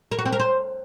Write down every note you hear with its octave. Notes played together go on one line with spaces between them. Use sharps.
A#4
F#4
C4
A#4
C5